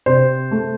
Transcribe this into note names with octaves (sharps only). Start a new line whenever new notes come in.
C3 C5
A3